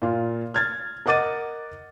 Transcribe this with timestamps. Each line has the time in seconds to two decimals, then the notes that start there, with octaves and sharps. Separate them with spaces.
0.02 A#2 F4
0.54 F6 G#6 A6
1.06 A#4 D#5 F#5 D6 A6 D#7